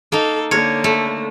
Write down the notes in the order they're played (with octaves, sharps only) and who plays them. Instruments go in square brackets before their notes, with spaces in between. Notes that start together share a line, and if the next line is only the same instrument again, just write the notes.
[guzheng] A#3 D#4 [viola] A4
[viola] D3 A#3 [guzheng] C#5
[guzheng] A3